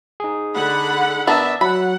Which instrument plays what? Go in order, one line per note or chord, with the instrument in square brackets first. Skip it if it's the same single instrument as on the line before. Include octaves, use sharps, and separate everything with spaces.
[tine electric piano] D#4 G#4
[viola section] D3 F#5 B5
[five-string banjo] B3 D4 A#4 [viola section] E5
[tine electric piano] F#3 [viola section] F#5 [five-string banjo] B5